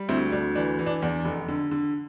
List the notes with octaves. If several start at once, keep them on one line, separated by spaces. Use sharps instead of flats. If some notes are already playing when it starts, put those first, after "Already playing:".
Already playing: G3
D2 C4 E4
D2 D4
E3 D4
E3
D4
E2 D4
F1
D3
D3